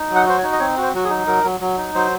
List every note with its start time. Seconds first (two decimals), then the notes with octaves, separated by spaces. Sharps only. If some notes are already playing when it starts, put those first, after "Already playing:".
Already playing: D#4
0.10 F#3
0.16 F#5
0.27 F#4 C5
0.38 C#5
0.43 D#4
0.52 D#5
0.59 C4 C#5
0.77 F#4 C5
0.94 F#3 F#4
1.05 G#4
1.10 D#4
1.27 F#3 A#4
1.44 F#3
1.61 F#3
1.78 D#4
1.95 F#3 C5